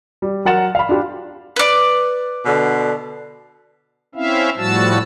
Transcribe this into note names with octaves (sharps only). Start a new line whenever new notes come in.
G3
F#3 A#4 F#5 A6 E7
F5 B5
D4 F4 G4
B4 D5
B2 D3
C4 C#4 E4 E5 F5
A2 F3 G3 F#4 A5 E6